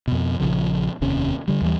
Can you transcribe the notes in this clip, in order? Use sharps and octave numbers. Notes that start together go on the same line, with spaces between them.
F2 B2
A#1 D#2 C#3 F3
F1 D#2 C3 C#4
D3 G3
D#2 E3 G3